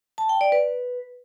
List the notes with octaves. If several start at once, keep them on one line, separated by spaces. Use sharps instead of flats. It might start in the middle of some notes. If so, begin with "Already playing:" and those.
A5
G5
D5
B4